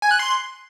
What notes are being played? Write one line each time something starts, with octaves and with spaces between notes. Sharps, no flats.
G#5
F#6
C6